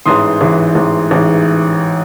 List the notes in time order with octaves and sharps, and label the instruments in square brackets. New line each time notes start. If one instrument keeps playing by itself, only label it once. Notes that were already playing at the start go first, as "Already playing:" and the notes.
[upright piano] A1 G#2 E3 C6 D#6
A1 G#2 E3
A1 G#2 E3
A1 G#2 E3